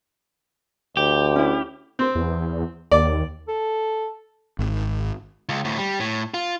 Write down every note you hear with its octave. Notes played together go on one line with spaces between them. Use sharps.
D2 G4
C#4 E4
C4
E2
D#2 D5
A4
G#1
C#2
D2 A2
G3
A2
F4